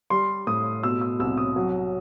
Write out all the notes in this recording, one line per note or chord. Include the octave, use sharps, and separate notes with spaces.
G3 C6
A2 D#6
B2 E6
E6
C2 E6
D#6
F#3